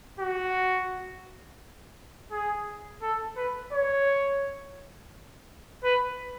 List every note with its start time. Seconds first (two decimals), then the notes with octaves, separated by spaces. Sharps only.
0.20 F#4
2.31 G#4
3.02 A4
3.37 B4
3.73 C#5
5.84 B4